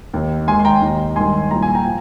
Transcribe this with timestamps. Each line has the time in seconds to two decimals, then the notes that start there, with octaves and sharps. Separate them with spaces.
0.13 D#2 D#3
0.47 G#1 G#2 D#3 G#5 C6
0.59 C6
0.65 G5 A#5
0.82 D#2 D#3
1.16 G#1 G2 D#3 G#5 C6
1.50 C2 A#2 F3 A#5
1.63 G#5
1.75 G5 A#5
1.85 F3